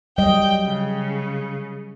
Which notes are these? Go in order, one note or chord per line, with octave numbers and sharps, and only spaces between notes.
F#3 G3 D#5 G5
C#3